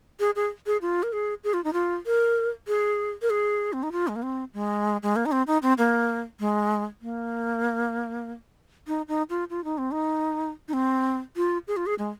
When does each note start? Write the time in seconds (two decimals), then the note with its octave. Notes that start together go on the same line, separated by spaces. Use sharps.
0.20 G#4
0.36 G#4
0.66 G#4
0.82 F4
1.03 A#4
1.13 G#4
1.44 G#4
1.54 F4
1.64 D#4
1.73 F4
2.06 A#4
2.68 G#4
3.22 A#4
3.30 G#4
3.73 C4
3.83 D#4
3.92 F4
4.08 G#3
4.16 A#3
4.23 C4
4.54 G#3
5.03 G#3
5.16 A#3
5.26 D#4
5.32 C4
5.47 D#4
5.62 C4
5.78 A#3
6.40 G#3
7.02 A#3
8.87 D#4
9.08 D#4
9.30 F4
9.50 F4
9.64 D#4
9.78 C4
9.92 D#4
10.68 D#4
10.74 C4
11.36 F4
11.68 G#4
11.77 F4
11.86 G#4
11.99 G#3